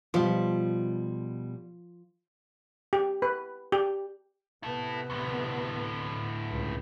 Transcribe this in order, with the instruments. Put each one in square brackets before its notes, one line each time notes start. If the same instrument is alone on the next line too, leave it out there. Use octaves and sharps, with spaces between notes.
[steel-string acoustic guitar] B2 G3 [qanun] F3
[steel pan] G4
B4
G4
[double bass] C3 B3 [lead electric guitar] E4 A4
[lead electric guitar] D2 A2
[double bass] C#2 G2